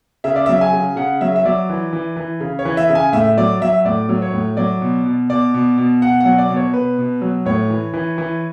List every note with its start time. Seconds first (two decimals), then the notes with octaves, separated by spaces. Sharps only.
0.24 C#3 E5
0.36 D5
0.46 F#3 E5
0.61 G#5
0.73 C#3
0.96 C#3 F#5
1.21 F#3 E5
1.36 E5
1.45 F#3 D5
1.69 E3
1.93 E3
2.16 E3
2.40 C#3
2.59 C#5
2.65 E3
2.77 E5
2.90 C#3
2.95 G#5
3.13 A2 E5
3.38 F#3 D5
3.61 F#3 E5
3.85 A2 D5
4.09 F#3
4.22 C#5
4.33 A2
4.57 F#3 D5
4.81 B2
5.06 B2
5.30 B2 D5
5.54 B2
5.78 B2
6.02 B2 F#5
6.20 F#3 F#5
6.38 D5
6.50 B2
6.56 C#5
6.74 B2 B4
6.98 B2
7.22 F#3
7.46 A2 C#5
7.70 E3
7.93 E3
8.18 E3